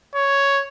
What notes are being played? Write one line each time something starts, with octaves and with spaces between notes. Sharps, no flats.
C#5